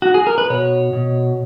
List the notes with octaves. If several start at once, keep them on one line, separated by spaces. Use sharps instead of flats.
F#4
G#4
A#4
B4
B2 C#5
B2